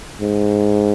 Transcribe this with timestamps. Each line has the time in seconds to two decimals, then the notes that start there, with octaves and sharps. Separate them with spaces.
0.21 G#2